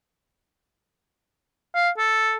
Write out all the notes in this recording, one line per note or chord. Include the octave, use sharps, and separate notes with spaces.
F5
A4